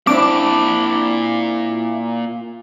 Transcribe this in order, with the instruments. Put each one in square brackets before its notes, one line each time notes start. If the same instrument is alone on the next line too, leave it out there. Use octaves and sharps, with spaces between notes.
[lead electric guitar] A#2 A5 [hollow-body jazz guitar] C4 D4 E4 [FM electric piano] D6